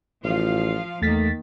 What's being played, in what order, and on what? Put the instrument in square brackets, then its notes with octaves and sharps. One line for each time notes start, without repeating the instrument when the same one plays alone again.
[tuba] A1 [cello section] F3 F4 F5
[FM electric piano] E2 A6 B6 [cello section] D#3 A#3 [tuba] A3